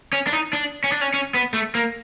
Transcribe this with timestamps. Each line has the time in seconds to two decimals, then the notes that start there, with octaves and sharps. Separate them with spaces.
0.13 C#4
0.27 D4
0.33 D#4
0.53 D4
0.84 C#4
0.92 D4
1.01 C#4
1.14 C#4
1.34 B3
1.54 A3
1.75 A#3